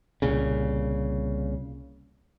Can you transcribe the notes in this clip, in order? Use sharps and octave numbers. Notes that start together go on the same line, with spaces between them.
C2 A#2 C#3